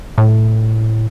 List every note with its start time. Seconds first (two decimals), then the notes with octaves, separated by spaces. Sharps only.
0.18 A2